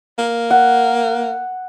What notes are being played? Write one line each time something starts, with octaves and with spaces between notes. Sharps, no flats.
A#3
F#5